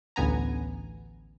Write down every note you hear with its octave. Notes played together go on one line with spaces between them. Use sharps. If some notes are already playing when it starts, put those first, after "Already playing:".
A1 D2 B3 G#5 A#5